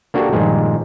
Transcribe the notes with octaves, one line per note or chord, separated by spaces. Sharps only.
A#3 D4 F#4 G4 A4 A#4
G2 A#2 D#3 F3 G#3